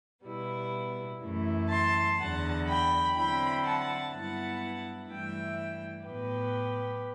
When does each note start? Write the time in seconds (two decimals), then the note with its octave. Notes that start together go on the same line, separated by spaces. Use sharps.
0.25 B2 G3 B3 E4
1.22 F#2 E3 A3 E4
1.69 A5 C6
2.18 E2 D3 F#3 F#5 A5
2.67 G5 B5
3.15 D3 F#3 C4 E4 G5 B5
3.63 F#5 A5
4.12 G2 F#3 B3 E4 F#5 A5
5.08 G2 E3 A3 E4 E5 G5
6.05 A2 F#3 B3 G4 B4